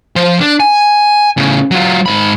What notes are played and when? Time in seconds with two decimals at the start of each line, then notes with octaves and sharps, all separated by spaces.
0.16 F3 C5
0.40 D4
0.60 G#5
1.37 A2 C#3
1.71 F#3 F4
2.06 G#2 B5